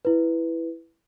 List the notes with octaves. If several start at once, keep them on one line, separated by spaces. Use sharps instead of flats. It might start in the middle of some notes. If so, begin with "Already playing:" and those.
E4 B4